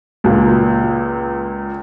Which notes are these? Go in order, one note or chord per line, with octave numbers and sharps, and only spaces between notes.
C#2 A#2